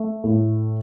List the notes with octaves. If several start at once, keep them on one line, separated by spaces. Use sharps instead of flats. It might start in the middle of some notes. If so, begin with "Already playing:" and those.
Already playing: A3
A2